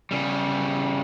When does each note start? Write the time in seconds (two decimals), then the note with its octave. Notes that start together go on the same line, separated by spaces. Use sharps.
0.11 C#3 G3